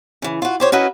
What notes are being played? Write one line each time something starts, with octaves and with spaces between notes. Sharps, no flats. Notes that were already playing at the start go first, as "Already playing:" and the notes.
C#3 E3
F4 F#4
G4 C5 C#5
C#4 E4 F#4 A#4 B4 D#5